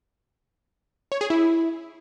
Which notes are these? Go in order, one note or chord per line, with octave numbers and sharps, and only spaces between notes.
C#5
G#4
E4